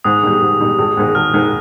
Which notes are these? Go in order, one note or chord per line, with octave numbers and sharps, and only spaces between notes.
G#2 D#6
D#3 G3
G#2
D#3 G3
G#1
G#2 D#3
G#1 F6
G#2 D#3